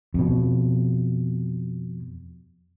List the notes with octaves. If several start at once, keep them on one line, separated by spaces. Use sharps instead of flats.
F2 B2